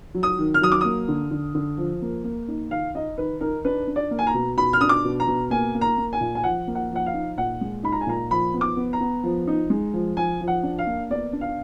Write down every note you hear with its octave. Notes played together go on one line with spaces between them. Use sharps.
F#3
D#6
D#3
F6
F#3 D#6
D6
A#3 D#6
D3
D3
D3
F3
A#3
A#3
D#4
D#3 F5
D#4 D#5
D#3 B4
D#4 A#4
D4 B4
D4
D5
A#3
G#5
A#5
B2
B2 B5
F6
D4 D#6
D6
B2
A#5
B2
A#3 G#5
A#3
A#5
A#3
G#5
A#2
G#5
F3 F#5
A#3
F#5
F3 F#5
F5
D#4
A#2 F#5
G#3
D#4 B5
A#5
G#5
A#2 A#5
F3 B5
B3
D6
B3
A#5
B3
F3
D#4
G#3
F3
F3 G#5
F3
F#5
D4
F5
A#3
B3 D5
D4
F5